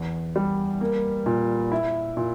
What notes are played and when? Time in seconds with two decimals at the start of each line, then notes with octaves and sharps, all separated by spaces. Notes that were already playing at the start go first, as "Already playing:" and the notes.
Already playing: E2
0.36 G3
0.81 A#3
1.26 A#2
1.72 E4
2.17 A#2